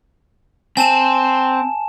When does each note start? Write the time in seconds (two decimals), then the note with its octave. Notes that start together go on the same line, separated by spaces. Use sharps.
0.77 C4 G#5 A5 E7